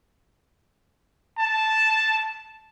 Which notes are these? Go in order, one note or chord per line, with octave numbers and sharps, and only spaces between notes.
A5